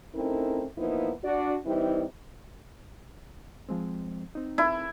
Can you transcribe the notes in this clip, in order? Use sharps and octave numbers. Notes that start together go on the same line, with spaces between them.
A3 C4 C#4 D#4 E4 A#4
E3 F3 A#3 B3 D#4 E4
D4 F#4 D5
E3 G3 C4 D#4 E4
F3 G#3 C4
C4 D#4
E4